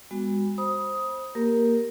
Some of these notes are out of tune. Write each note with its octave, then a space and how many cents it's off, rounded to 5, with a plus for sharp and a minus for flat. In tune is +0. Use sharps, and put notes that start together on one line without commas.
G#3 -40 B3 +0 F#4 +0
C5 +10 B5 -30 D#6 +10
A#3 +0 G4 +0 A#4 +0